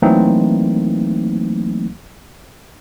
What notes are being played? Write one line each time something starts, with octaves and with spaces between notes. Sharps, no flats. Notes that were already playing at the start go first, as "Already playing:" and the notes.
E3 F#3 A3 A#3 C4 D#4